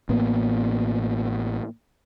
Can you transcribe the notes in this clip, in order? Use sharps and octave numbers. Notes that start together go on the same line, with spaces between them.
A1 A2 A#3 B3